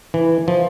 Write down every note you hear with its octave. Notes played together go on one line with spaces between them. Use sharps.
E3
F3